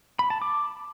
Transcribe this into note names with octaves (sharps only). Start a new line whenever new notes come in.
B5
A5
D6